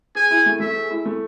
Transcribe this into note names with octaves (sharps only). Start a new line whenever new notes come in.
G#4 G#5
E4
A3
A3 E5
G#4
E4
A3